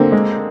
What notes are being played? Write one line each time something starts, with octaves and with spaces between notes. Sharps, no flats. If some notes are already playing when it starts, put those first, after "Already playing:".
Already playing: D3 A#3 C4
G#3